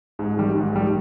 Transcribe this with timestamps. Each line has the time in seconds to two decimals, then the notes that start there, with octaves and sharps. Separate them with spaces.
0.19 G#2
0.37 D#3 G3
0.55 G#2
0.72 D#3 G3